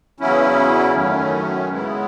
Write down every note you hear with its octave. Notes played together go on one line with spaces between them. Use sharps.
E2 C#3 F#3 C#4 E4
F#2 D#3 F#3 A3 C#4
C#3 G#3 B3 E4